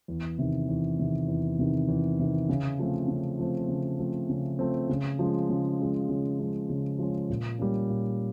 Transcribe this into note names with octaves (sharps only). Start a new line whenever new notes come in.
E2
C3 D#3
E2
C3 D#3
E2
C3 D#3
E2
C3 D#3
C#3
F3 A3 C4
C#3
F3 A3 C4
C#3
F3 A3 C4
C#3
F3 A3 C4
C#3
F3 G#3 C#4
C#3
F3 G#3 C#4
C#3
F3 G#3 C#4
C#3
F3 G#3 C#4
A#2
G3 A#3 C#4
A#2